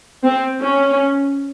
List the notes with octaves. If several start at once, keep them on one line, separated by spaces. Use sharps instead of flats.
C4
C#4